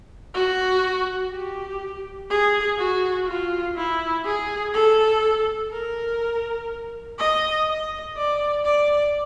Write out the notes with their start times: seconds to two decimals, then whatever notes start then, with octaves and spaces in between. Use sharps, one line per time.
0.34 F#4
1.31 G4
2.30 G#4
2.78 F#4
3.27 F4
3.76 E4
4.25 G#4
4.74 A4
5.71 A#4
7.19 D#5
7.67 D#5
8.17 D5
8.64 D5